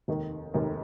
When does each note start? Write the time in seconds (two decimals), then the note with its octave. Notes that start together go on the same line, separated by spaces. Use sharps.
0.08 F1 D#2 D#3
0.54 F1 D#2 D#3